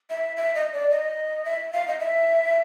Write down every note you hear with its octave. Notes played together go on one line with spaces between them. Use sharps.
E5
E5
D#5
D5
D#5
E5
F5
D#5
E5